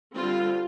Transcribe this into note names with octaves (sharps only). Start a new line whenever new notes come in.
D3 G3 C4 F4